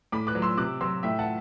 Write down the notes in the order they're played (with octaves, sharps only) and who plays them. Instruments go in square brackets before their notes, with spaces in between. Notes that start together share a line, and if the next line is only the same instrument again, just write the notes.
[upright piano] A2 B5 D6
D6 F#6
F#3
C6 E6
C3 D6 F#6
F#3 C6 E6
A2 E5 G5
F#5 A5